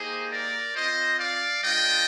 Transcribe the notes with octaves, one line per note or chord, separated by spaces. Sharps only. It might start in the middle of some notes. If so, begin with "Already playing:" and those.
Already playing: A#3 D#4 G4 G#4 C5
A#4 D5
C4 F4 C5 D#5
D5 F5
G#3 D4 F4 D#5 G5